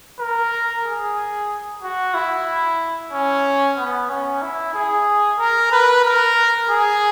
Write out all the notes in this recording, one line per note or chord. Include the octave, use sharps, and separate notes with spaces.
A#4
G#4
F#4
E4
C#4
B3
C#4
E4
G#4
A#4
B4
A#4
G#4